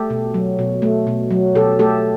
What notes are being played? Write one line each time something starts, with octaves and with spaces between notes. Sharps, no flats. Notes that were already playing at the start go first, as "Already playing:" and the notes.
Already playing: A3 G4 A4
B2
F#3
B2
A3
B2
F#3
B2 G4 A4
A3 G4 A4